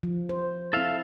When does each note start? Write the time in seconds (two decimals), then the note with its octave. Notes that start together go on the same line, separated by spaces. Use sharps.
0.03 F3
0.29 C5
0.73 C4 E4 A4 E5 F5